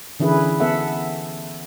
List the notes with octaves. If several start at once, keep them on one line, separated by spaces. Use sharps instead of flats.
D3 E3 C#4 E4 G#4 B4
B3 A4 E5 F#5